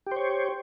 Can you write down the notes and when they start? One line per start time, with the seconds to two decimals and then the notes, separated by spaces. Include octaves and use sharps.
0.07 G4
0.12 C5
0.16 C#5